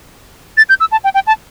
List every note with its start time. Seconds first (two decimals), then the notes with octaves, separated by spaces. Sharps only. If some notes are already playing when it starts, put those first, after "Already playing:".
0.57 A6
0.69 G6
0.80 E6
0.91 A5
1.04 G5
1.14 G5
1.27 A5